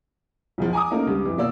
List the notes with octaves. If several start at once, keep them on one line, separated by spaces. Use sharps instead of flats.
B1 E2 F3
G#5 A#5 D6 D#6
A3 A#3 C#4 D#4 A#4
C#2 G2
F2 E3
B2 A#3 D5 E6